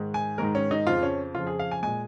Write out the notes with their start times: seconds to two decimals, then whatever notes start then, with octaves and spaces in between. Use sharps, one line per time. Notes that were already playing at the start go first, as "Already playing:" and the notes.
Already playing: G#2 D#3 G#3
0.14 G#5
0.38 G#2 D#3 G#3 A#4
0.55 C#4
0.71 D#4
0.87 F2 C#3 F3 F4
1.03 C#4
1.35 F2 C#3 F3 F4
1.47 G#4
1.59 F5
1.71 G#5
1.83 A#2 G#3 G#5